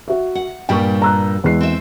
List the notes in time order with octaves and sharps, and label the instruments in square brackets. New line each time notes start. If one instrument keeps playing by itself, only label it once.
[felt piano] F#4 E5
[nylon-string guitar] F#5
[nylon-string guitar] G2 A#2 G3 [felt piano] G5 C#6
[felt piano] A#5 E6 F#6
E2 G#3 C7
[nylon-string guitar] C4 E5